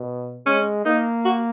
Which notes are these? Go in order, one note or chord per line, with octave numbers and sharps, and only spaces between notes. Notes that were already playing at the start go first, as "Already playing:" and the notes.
Already playing: B2
G#3 C#4
A#3 D#4
F#4